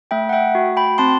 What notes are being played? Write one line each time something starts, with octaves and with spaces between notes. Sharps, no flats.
A3 E5 G5
F#5
E5 G5
F#4
G5 B5
C4 A5 C6